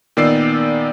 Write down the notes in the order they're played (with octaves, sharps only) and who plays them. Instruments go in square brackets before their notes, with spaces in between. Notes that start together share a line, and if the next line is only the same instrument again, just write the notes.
[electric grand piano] A#2 D#3 B3 D5 E6 C7